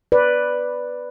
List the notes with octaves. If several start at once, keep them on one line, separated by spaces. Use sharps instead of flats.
B4 D5